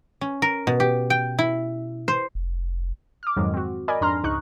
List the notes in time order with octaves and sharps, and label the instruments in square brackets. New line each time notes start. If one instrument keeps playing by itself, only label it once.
[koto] C#4
A#4
B2
G4
G5
E4
C5
[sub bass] F1
[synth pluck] D6 F6
F2 G#2 D#3 F#3 G#3
C4 F#4
A#4 D5 D#5 G#5 B5
F2 G#2 D4 A#5 C6 F6
C#2 G#2 D#4 C#6 F#6